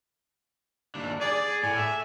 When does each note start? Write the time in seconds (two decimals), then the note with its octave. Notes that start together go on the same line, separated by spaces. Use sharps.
0.95 D#2 D4
1.21 G#4 D5
1.63 A2 G#5
1.79 E5